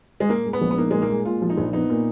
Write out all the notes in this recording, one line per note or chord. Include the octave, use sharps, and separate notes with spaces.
G#3
A#2 A#3
G#3
B3
A#1
B3
A#3 D#4
A#2 G#3
A#3
G#3
A#2 F4
F3
D#4
A#1
B3 D#4
A#2